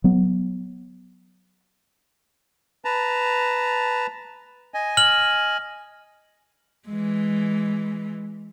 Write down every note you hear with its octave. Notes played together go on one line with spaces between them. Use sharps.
F#3 B3
B4 A5 A#5
D#5 G#5
F6 F#7
E3 G#3